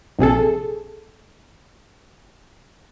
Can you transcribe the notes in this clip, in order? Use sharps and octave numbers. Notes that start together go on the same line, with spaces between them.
A#1 C3 G#4 A4